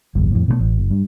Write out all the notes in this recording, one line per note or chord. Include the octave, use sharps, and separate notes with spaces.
G#1 C#2 F#2 A#2
F2 A2
B2 E3 A3
A1
F#1
G2